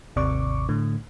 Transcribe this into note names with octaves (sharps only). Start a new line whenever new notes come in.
G#1 D#2 C3 D5 C#6 D6
A2 D3